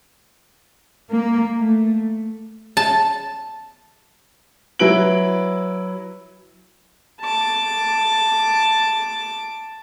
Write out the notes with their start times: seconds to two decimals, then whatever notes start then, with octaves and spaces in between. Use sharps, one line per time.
1.10 A#3
1.58 A3
2.77 A5
4.79 F#3 E4 B4 D7 F#7
7.21 A5 D6